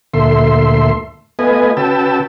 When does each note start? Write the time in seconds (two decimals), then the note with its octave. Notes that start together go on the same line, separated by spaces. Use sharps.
0.14 D2 A#2 A3 E5 C6
1.39 A3 B3 F4 B4 D#5 G#5
1.77 C#3 F#4 B4 G5 A5 E6